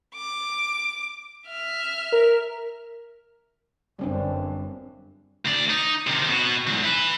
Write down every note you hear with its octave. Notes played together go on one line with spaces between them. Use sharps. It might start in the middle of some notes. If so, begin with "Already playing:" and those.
D6
E5 F6
A#4
G1 F#2 G3 C4 D4
D2 D5
D#4
C3 D#3
B2 F#4
E2 G#2
E4 B4